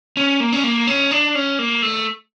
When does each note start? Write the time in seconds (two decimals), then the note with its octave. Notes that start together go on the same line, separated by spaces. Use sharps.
0.17 C#4
0.40 A#3
0.53 C#4
0.64 A#3
0.87 C#4
1.11 D4
1.35 C#4
1.59 A#3
1.82 A3